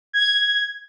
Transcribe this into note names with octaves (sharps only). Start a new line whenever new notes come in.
G#6